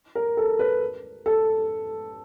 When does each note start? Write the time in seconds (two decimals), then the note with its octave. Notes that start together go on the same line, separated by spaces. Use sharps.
0.15 A#4
0.37 A4
0.59 B4
1.26 A4